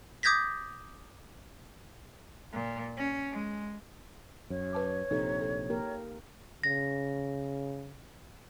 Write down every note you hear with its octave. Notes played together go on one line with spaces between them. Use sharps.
D6 D#6 G6 G#6 A#6 B6
A#2
C#4
G#3
F#2 C#5
B4 A5 D6
A#1 C3 D#4 A4
A4
A#3 G4 A#4
C#3 A#6